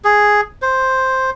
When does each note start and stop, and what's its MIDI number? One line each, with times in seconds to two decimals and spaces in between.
0.04 0.41 68
0.62 1.30 72